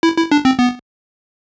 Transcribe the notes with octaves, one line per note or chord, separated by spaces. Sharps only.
E4
E4
D4
C4
B3